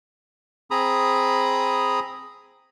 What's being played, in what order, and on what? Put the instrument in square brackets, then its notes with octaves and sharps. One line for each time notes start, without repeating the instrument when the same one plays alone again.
[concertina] C4 G#4 A#5 B5 D#6